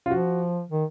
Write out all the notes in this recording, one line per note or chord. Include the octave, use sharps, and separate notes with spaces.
F4
F3 F#4
D#3